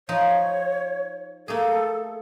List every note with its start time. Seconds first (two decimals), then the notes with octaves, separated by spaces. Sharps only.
0.09 F3 D#4 C#5
1.48 A3 A#3 G#4 A4